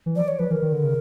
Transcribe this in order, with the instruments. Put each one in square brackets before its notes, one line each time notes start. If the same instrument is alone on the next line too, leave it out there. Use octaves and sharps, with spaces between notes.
[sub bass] E3
[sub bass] F3 [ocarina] D5
[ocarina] C#5
[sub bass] F3 [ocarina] B4
[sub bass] E3 [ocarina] A#4
[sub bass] D#3
D3
C#3